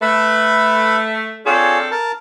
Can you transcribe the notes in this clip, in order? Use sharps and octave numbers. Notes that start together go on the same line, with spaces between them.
A3 B4 E5 B5
C4 D4 F4 G#4 A4 C#5
A#4 A5